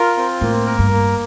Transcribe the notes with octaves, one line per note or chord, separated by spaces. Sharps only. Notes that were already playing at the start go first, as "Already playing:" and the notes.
Already playing: F4 A#4
C4
A2 A#3
A#4
G2
A#3